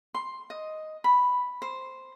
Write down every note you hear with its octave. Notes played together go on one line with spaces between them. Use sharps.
C6
D#5
B5
C5